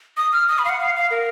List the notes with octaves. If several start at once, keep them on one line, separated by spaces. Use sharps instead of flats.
D#6
F6
D#6
B5
F5
F#5
F5
F5
A#4